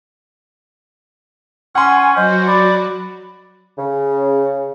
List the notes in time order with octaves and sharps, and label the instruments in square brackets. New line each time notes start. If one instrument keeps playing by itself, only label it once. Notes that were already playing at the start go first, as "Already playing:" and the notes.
[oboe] C#4 [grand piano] F#5 C6 [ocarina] G#5
[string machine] F#3 F#4 [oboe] C5 [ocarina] D#5
[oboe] D5 [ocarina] B5
[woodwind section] C#3